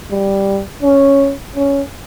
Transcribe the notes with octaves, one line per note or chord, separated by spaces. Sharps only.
G3
C#4
C#4